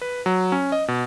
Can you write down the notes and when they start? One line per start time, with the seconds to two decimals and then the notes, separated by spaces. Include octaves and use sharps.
0.01 B4
0.26 F#3
0.52 C#4
0.72 D#5
0.88 B2